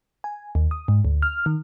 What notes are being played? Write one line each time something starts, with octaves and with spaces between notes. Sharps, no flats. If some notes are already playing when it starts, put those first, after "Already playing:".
G#5
D#2
D#6
G#2
D2
F6
D#3